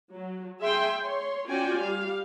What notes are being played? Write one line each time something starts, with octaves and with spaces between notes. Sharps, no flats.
F#3
G#4 E5 G5 G#5 C6
C#5 C6
C#4 F4 F#4 D5 G5 G#5
G3 G4 F5